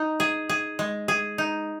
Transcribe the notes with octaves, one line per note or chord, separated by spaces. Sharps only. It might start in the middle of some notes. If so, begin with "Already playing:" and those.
Already playing: D#4
G#4
G#4
G#3
G#4
D#4